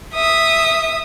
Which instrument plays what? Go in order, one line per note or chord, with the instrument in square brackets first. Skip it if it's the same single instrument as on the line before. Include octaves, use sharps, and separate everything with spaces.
[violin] E5 D#6